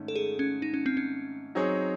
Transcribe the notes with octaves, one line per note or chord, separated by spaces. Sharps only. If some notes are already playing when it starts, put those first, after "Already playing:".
Already playing: G#2 D#3 A3 C#4
A4
G#4
C#4
D#4
C#4
C4
C#4
F#3 C4 D#4 G#4 C#5